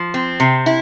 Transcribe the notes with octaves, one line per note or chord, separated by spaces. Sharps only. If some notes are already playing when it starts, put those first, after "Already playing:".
Already playing: F3
C4
C3
E4